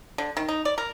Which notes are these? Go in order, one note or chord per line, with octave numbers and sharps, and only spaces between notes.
D3
D#3
D#4
D5
A#4